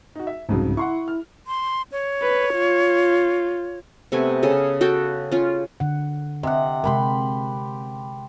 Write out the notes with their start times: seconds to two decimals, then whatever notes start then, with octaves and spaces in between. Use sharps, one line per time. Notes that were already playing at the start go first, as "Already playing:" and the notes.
0.15 D#4 F#4
0.27 E5
0.49 C2 F2 G#2 C#3 F#3
0.77 E4 F#5 C6 C#6
1.08 F6
1.47 C6
1.92 C#5
2.22 B4
2.55 F4
4.12 C3 A3 B3 G#5
4.43 C#3 G#4 A4 D#5
4.81 F#4 A4 G5 A5
5.32 C#4 F4
5.80 D3 F#5
6.43 C3 D#5 F#5
6.84 C3 G#3 G4 A#4 B5 C6